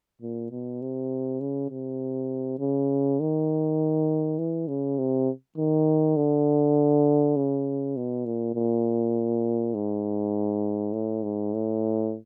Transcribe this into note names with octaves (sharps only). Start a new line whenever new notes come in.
A#2
B2
C3
C#3
C3
C#3
D#3
E3
C#3
C3
D#3
D3
C#3
B2
A#2
A#2
G#2
A2
G#2
A2